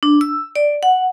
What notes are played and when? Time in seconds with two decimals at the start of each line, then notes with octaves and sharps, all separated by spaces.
0.03 D4
0.21 E6
0.56 D5
0.83 F#5